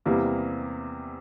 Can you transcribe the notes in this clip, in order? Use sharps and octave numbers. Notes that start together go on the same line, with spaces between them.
E2 C3 G3 A#3 E4